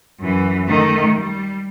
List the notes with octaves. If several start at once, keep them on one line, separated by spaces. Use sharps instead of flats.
F#2 E3
D#3 A3
G3